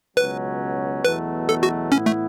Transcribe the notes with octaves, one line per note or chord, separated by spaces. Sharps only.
C#2 B2 F#3 C#4 B4
E2 B2 F#3 A3 B4
A4
F#4
A2 E3 B3 C#4 E4
A3